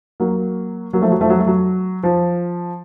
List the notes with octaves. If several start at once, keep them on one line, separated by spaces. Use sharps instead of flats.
F#3 A#3
F#3 A#3
F3 A3
F#3
F3 A3
F#3
A3
F#3
F3